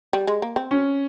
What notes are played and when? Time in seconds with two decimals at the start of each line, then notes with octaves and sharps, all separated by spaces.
0.13 G3
0.27 G#3
0.42 A#3
0.56 C4
0.71 C#4